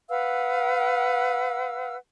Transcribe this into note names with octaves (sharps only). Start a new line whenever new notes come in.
B4 F5 F#5 E6